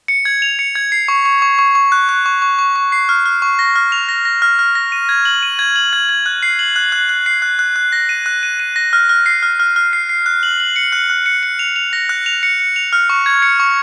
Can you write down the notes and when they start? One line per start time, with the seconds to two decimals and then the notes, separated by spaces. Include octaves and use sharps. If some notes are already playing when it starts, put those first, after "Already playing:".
0.08 C#7
0.25 G#6
0.42 F7
0.59 C#7
0.75 G#6
0.92 C7
1.08 C#6
1.26 C#6
1.42 C#6
1.59 C#6
1.75 C#6
1.92 F#6
2.09 F#6
2.26 C#6
2.42 C#6
2.59 C#6
2.76 C#6
2.92 C7
3.09 F6
3.26 F6
3.42 C#6
3.59 A#6
3.76 F6
3.92 F7
4.09 A#6
4.25 A#6
4.42 F6
4.59 F6
4.75 A#6
4.92 D#7
5.09 G#6
5.25 F#7
5.43 D#7
5.59 G#6
5.76 F#7
5.93 G#6
6.09 G#6
6.26 F#6
6.43 C7
6.59 F#7
6.76 F#6
6.92 F#6
7.09 F#6
7.26 C7
7.42 F#6
7.59 F#6
7.76 F#6
7.92 A#6
8.09 D#7
8.26 F#6
8.43 D#7
8.60 D#7
8.76 A#6
8.93 F6
9.09 F6
9.26 C7
9.43 F6
9.60 F6
9.76 F6
9.93 C7
10.09 C7
10.26 F#6
10.43 F#7
10.60 F#7
10.76 C#7
10.92 F#6
11.10 F#6
11.26 C#7
11.43 C#7
11.59 F7
11.76 F7
11.93 A#6
12.09 F#6
12.26 F7
12.43 C#7
12.60 C#7
12.76 F7
12.93 F6
13.09 C#6
13.26 G#6
13.42 C#7
13.60 C#6